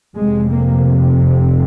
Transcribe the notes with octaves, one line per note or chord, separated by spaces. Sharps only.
F1 F2 C3 G#3
A#3